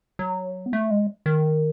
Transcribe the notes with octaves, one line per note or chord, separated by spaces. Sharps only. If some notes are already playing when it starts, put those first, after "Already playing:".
F#3
B3
A3
G#3
D#3